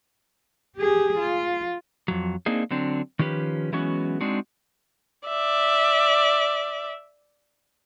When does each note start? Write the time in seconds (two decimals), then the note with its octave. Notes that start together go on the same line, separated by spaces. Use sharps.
0.77 G4 G#4
1.18 F4
2.08 F2 F#3
2.46 A#3 C4 D4 D#4 G#4
2.71 D3 F#3 C4 D4
3.19 D#3 F3 C#4 G4 B4
3.72 E3 F#3 G#3 B3 C#4 F#4
4.21 G#3 C4 D4 D#4 F#4
5.28 D5 E5